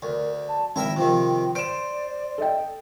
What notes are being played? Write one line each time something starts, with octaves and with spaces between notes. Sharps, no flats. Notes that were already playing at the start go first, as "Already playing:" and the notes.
D2 A#4
A5
G#1 E4 A#4 E5 G5
C3 D#3 F3
C5 D5 D7 E7
A4 D#5 G5